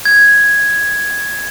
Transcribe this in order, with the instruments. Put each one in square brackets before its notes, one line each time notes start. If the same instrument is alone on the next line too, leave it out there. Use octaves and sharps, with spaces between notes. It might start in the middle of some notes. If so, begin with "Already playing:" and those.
[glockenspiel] G#6